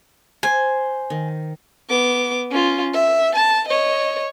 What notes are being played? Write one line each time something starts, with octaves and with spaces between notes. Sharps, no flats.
C5 G#5
D#3
B3 D6
C#4 F4
E5
A5
C#5 D#5